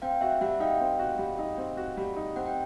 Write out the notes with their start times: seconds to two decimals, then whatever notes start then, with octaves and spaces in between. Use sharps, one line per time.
0.02 C4 F5 G5
0.21 F#4 E5 F#5
0.41 G3 E5 F#5
0.60 D#4 F5 G5
0.81 C4
0.99 F#4
1.19 G3
1.39 D#4
1.58 C4
1.77 F#4
1.97 G3
2.16 D#4
2.36 C4 F#5
2.46 G5